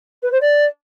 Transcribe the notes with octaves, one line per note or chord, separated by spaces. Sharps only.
B4
C5
D5